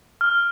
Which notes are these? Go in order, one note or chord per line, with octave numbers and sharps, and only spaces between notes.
F6